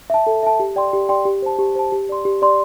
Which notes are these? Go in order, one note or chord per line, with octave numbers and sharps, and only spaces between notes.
E5 A5
A4
E5 A5
G4
D5 G5 C6
G4
D5 G5 C6
G4
C5 A5
G4
C5 A5
G4
D5 C6
G4
D5 C6